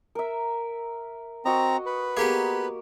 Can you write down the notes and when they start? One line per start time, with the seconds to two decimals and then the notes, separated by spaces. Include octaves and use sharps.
0.15 A#4 E5
1.45 C4 F#4 D#5 A#5
1.86 B4
2.17 A#3 B3 G4 G#4